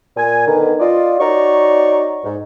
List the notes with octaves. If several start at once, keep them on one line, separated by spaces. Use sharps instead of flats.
A#2 G#5
D3 D#3 B3
F4 D5 D#5
D#4 F#4 C#5 D5 A#5 C#6
G#2